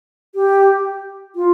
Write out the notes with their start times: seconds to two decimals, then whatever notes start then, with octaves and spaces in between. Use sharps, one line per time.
0.35 G4
1.36 F4